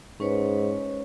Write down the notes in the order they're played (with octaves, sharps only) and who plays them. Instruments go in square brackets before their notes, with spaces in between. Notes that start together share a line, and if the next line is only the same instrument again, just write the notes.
[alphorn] G#2 [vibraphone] C#4 B4 C#5